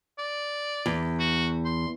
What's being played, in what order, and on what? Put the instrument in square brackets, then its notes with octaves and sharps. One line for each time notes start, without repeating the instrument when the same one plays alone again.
[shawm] D5
[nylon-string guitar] E2
[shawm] F#4
C6